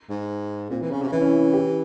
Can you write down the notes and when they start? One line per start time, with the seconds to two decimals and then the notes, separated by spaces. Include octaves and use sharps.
0.10 G#2
0.70 A#2 C4
0.82 E3
0.91 C#3 C#4
1.02 C3
1.08 C#3
1.12 E3 E4
1.22 C#4
1.26 E4
1.53 G4